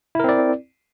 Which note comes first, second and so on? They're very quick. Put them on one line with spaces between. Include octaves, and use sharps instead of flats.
E4 A#4 C4 D5